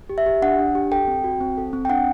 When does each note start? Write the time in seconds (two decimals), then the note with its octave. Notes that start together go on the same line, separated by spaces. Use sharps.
0.10 G4
0.18 E5
0.26 G4
0.42 D4 F#5
0.59 D4
0.75 G4
0.92 A4 G5
1.08 C4
1.24 F#4
1.41 C4
1.57 A4
1.73 C4
1.85 G5
1.89 D4 F#5